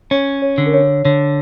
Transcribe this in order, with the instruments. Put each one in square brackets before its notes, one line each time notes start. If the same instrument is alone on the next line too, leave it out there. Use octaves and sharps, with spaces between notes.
[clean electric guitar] C#4 [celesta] C#5
[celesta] C#5
[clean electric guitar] D3
[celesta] A#4
C#5
[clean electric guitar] D3 [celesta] C#5